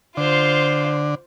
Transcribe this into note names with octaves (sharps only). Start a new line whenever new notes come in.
D3 F4 C5